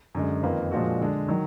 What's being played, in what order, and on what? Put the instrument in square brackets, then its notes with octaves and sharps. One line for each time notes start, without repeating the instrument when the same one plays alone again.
[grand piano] F#2 D3 G#3
F2 D#3 A#3 F4 B4
A#2 F3 G#3 D4 F#4
D3 G#3 D4
D#3 F#3